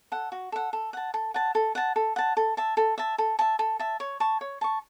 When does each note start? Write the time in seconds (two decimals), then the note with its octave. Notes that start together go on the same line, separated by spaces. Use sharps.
0.12 A4 F#5
0.32 F#4
0.52 A4 F#5
0.73 A4
0.93 F#5 A5
1.14 A4
1.34 F#5 A5
1.55 A4
1.75 F#5 A5
1.96 A4
2.16 F#5 A5
2.37 A4
2.57 E5 A5
2.77 A4
2.98 E5 A5
3.18 A4
3.39 E5 A5
3.59 A4
3.79 E5 A5
4.00 C#5
4.20 A5 C#6
4.41 C#5
4.61 A5 C#6